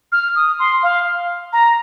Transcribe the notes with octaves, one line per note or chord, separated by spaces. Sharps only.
F6
D#6
C6
F5
A#5